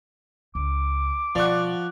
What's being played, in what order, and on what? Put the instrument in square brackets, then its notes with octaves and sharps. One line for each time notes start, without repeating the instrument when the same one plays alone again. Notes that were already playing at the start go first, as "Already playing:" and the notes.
[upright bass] C#2 [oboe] D6
[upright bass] B2 G3 [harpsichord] F3 C#6 [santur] D5 F#5